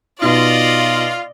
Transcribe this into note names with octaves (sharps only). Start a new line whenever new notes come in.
B2 D#4 F4 D5 D#5